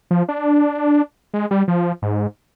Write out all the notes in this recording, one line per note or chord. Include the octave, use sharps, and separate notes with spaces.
F3
D4
G#3
G3
F3
G#2